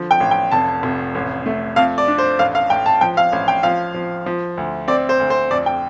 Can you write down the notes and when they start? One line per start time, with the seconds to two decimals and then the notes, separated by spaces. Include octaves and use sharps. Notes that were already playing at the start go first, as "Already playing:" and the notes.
Already playing: D3 F3
0.11 G5
0.20 A1
0.31 G5
0.51 F1 A5
0.83 F1
1.15 A1
1.46 A3
1.76 F2 F5
1.98 D5
2.08 D4
2.18 C5
2.39 A1 F5
2.55 F5
2.70 A1 G5
2.86 A5
3.01 F3 G5
3.17 F5
3.33 A1
3.48 G5
3.63 F3 F5
3.94 F3
4.26 F3
4.57 D2
4.88 C4 D5
5.09 C5
5.20 D2
5.30 C5
5.51 F2 D5
5.66 G5